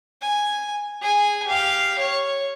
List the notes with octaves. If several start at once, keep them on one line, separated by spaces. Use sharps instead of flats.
G#5
G#4 G#5
G4 F5
C#5